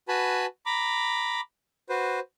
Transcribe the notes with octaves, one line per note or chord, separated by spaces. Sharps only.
F#4 B4 G#5 A5 B5
A#5 B5 D6
F#4 B4 C5